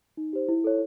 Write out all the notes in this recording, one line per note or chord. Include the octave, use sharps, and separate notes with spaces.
D#4
G4 C5
E4
A4 C#5